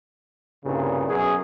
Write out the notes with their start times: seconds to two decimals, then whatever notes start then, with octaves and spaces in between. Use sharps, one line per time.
0.64 C2 G2 A#2 C#3
1.09 F#2 B2 G#4